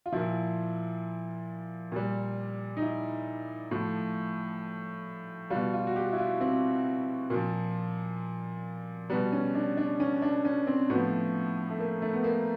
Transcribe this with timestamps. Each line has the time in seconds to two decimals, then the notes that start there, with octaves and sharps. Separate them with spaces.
0.06 F4
0.12 A#2 F3 E4
1.92 A#2 G3
2.77 D#4
2.82 E4
3.71 A2 F3
5.50 G3 F4
5.55 B2
5.74 F4
5.87 F#4
5.96 G4
6.13 E4
6.18 F4
6.41 C4
7.30 A#2 F3
9.10 G3 B3
9.13 B2
9.32 C#4
9.55 D4
9.77 D4
10.00 C#4
10.22 D4
10.45 C#4
10.67 C4
10.90 A2 F3 B3
11.70 A3
11.79 A#3
12.02 A3
12.13 B3
12.24 A#3